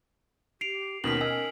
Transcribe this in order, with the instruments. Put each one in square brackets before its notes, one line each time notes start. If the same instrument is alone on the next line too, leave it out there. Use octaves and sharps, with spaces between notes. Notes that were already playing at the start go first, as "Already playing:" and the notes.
[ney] G4 [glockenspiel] C7 D7 F7
[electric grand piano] D#2 B2 D#3 [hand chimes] C#4 B6 [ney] A#4 [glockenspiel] F#7
[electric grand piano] D#5 [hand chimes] G#5 [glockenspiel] E6